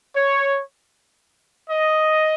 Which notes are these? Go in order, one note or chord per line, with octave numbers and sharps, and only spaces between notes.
C#5
D#5